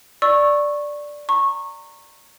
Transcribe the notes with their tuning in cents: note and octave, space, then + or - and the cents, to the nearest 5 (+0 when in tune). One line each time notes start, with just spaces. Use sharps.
D5 +0 C#6 -15 E6 +0
A#5 -25 C#6 -20